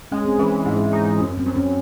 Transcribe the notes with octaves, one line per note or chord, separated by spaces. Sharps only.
G#3 C#4
C4
E3 C#4
G#2
D#4
F#2
C4
F#2
C#4